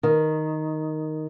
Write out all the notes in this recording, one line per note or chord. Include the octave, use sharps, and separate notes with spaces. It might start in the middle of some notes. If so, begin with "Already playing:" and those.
D#3